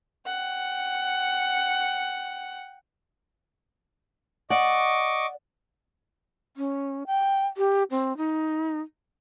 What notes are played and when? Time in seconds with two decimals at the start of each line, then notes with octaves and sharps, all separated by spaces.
0.26 F#5 G5
4.50 D5 D#5 F#5 C#6 D6
6.57 C#4
7.07 G5
7.57 G4
7.91 C4
8.17 D#4